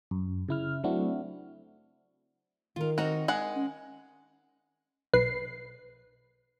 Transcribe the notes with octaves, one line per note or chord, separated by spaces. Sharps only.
F#2
C#3 E4 F6
F#3 A3 C4 D4 E4 F#4
D#3 F4 A#4
C4 D#4 F#4 A#4
G#3 F#5
C#4
B1 B4 C7